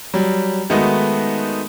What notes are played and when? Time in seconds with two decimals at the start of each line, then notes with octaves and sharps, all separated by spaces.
0.14 F#3 G3
0.70 D#3 G#3 A3 B3 D#4 F#4